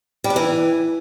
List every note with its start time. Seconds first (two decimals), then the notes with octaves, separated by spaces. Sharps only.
0.24 G3
0.30 D4
0.36 E3